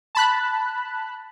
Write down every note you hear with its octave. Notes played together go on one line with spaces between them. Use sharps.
A5 B5 F#6